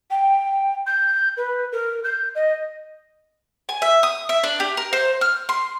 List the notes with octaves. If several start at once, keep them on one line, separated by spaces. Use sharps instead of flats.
G5
G6
B4
A#4
G6
D#5
G#5
E5
D#6
E5
D4
G4
A#4
C5
F6
C6